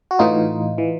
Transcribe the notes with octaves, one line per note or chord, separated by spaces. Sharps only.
F#4
A2 E3 D#4 F4
E3